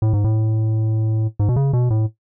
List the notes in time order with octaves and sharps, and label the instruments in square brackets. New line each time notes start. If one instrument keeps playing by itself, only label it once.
[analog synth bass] A2
G#2
A2
G#2
B2
C#3
B2
A2